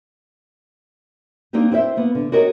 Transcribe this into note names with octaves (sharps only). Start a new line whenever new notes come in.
G3 A#3 C4 D4 D#4 G4
C4 E4 C5 E5
A#3 B3
D3
F#4 G4 A#4 C#5 D#5